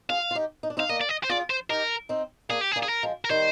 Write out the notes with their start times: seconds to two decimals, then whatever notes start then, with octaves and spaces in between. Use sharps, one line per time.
0.10 F4 G#4 F5
0.31 F4
0.35 D#4 G4
0.63 D#4
0.70 D4
0.77 C4 D#4 F5
0.89 A#3 D4 D#5
1.01 D5
1.09 D#5
1.24 C5
1.29 F4 G#4 D5
1.50 C5
1.69 D#4 G4 A#4
2.09 C4 D#4
2.49 A#3 D4 G#4
2.61 G4
2.72 G#4
2.76 A#3 D4
2.83 G#4
2.89 A#4
3.03 F3 G#3
3.25 A#4
3.29 D#3 G3 C5